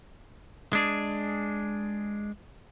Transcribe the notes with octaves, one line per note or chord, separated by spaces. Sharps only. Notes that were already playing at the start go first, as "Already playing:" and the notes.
G#3 D4 G#4